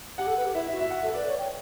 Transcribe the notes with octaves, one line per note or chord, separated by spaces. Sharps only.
G4 F#5
A4
B4
G4
E4 E5
E5
F#4
E5
F#4 F#5
A4 E5
B4 D5
C#5
G5